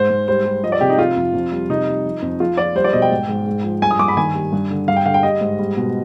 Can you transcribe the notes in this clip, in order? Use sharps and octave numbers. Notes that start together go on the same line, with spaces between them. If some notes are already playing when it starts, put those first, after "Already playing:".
Already playing: G#2 C5
G#2
G3 C5
G3
F3 D#5
D5
C3 G4
D#4
F3 F4
F2
F2
G3
C3 D#4
G3
F3
F2
F3 F4
F3 D5
G3 C5
D5
B2 D#5
G5
G#2
G#2
G#2
F3
G2 G#5
D#6
G2 D6
B5
D#3 G#5
G3
G2
D3
G2 F5
G5
D3 F5
G5
G3 D#5
G#2
G3
B2